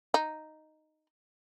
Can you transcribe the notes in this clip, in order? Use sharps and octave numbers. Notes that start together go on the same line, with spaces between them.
D#4